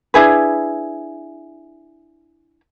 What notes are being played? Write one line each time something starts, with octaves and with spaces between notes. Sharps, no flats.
D4 E4 G#4 B4